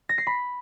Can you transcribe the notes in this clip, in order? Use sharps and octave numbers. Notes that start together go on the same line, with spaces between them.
A#6
C7
B5